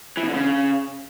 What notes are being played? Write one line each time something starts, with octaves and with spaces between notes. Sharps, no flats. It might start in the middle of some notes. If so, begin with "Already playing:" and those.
E3
B2
D3
C#3